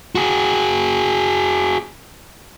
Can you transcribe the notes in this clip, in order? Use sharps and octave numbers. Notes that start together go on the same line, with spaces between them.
F#4 G#4